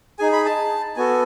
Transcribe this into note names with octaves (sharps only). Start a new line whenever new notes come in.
D#4 G#4 G#5
B5
A5
B3 F#4 A4 G#5